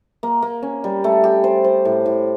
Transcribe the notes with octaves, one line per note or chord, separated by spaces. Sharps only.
A#3
A#3
C#4
G3
A3
G4
C5
C5
A2
A2